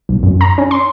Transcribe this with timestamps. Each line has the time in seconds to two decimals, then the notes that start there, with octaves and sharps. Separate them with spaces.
0.09 B1
0.23 F#2
0.41 A#5
0.58 C#4
0.71 C6